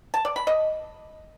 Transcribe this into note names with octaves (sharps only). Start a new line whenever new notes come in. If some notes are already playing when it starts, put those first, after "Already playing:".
A5
D5
B5
D#5